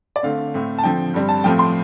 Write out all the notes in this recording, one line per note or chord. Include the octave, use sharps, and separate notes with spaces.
D5
D3 A3 C4 F5
A2 A3 C4
A5
D3 F3 C4 G5
G2 G3 C4
A5
A2 F3 A3 C4 G5
C6